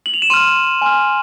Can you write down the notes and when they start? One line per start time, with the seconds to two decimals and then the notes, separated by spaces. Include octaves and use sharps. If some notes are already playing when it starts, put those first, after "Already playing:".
0.06 F#7
0.14 F7
0.22 E7
0.30 C6 F6 D#7
0.82 G#5 C6 F6